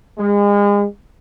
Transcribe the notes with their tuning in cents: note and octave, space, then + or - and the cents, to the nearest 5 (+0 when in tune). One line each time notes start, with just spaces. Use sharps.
G#3 -35